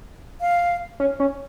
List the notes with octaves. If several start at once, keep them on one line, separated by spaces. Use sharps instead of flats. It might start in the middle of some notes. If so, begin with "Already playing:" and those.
F5
C#4
C#4